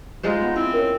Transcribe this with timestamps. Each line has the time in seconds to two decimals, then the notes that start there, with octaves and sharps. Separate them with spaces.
0.23 G#3 D#4 F4 C5
0.42 B3
0.56 C4 E4
0.74 C#4 A#4